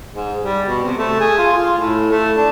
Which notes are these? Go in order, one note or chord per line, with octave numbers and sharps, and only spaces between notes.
G#2
G3
B2
C3
A3
G#4
F4
F4
A2
A3
D4